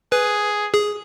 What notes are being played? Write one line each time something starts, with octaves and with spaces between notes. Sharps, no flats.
G#4 B4
G#4